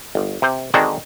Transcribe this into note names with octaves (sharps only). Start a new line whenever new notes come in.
G1
C3 C5
D3 D#3 G#3 C4 D4 F#4